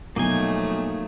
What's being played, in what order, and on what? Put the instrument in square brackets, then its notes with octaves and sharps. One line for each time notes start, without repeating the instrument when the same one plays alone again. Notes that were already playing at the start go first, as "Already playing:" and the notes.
[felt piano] B1 [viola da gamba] F3 F#3 A3 [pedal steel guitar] A#3 D#4 G#5